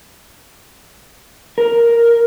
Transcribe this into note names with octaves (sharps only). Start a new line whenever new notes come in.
A#4